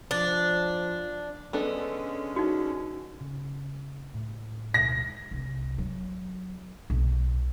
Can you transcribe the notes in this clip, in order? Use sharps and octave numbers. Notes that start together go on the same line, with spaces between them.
F3 D4
D3 G#3 B3 C#4 D4 A4
D#4 F#4
C#3
A2
D2 B2 G#3 A#6
C2
F#3
B1